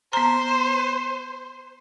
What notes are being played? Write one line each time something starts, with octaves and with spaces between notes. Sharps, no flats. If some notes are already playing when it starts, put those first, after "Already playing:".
B3 C5 A#5